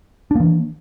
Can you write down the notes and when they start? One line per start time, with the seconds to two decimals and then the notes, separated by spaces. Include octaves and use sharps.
0.31 D4
0.35 A#3
0.40 E3